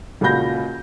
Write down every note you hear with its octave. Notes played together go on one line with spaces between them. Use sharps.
C#2 A#2 F#4 B5 G6 A#6